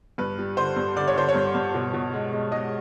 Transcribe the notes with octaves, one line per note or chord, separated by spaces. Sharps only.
G2 B4
G3
D3 C5
G2
D3 D5
C#5
D3 C5
C#5
G2
G2
B2
B2
G#3
G#3
G#3 D#5